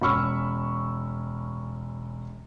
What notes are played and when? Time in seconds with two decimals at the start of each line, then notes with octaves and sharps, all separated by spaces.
0.02 E1 C#4 B5 C#6 E6 F6